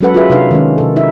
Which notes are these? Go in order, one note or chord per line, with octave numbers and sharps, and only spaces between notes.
F#3 G#3 C#4 A4 B4 F#5
F4 F#4 G#4 A4 B4 E5
C3 D4 D#4 B4 F5
D#3 G#3 C#4
C3 A4
D#4 E4 E5